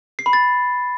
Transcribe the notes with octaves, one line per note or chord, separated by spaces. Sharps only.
C7
B5
A6